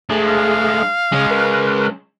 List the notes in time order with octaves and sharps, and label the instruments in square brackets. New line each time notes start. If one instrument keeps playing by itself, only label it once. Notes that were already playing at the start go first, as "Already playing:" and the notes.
[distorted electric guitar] G#3 D4 [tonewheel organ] A3 G#4
[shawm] F5
[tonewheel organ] C#3 D#6 [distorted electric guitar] G#3 C#4
[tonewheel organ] A#4 B4